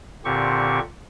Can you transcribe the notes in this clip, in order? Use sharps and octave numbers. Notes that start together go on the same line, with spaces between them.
A#2 D3 C4 G4 C#6